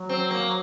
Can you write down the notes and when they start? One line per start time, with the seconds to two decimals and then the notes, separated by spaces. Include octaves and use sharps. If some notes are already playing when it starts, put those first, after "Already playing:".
Already playing: F#3
0.09 C4
0.30 A#3